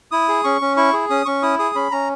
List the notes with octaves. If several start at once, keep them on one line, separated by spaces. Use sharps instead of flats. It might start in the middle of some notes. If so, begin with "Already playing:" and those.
E4 D#6
G#4
C#4 C#6
C#4
E4 C#6
G#4
C#4 D#6
C#4 C#6
E4 D#6
G#4 D#6
C#4 B5
C#4 A#5